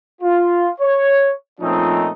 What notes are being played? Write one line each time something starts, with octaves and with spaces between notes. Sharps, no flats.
F4
C#5
A#2 F3 A3 C4 C#4 D#4